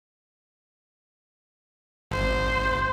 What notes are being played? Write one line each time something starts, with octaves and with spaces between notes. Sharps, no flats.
G#1 C5